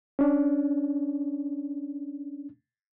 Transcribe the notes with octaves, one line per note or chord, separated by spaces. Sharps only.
C#4 D4